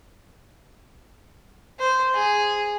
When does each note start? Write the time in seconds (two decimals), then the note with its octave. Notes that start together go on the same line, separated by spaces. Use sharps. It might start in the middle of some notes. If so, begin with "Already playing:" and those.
1.80 C5
2.14 G#4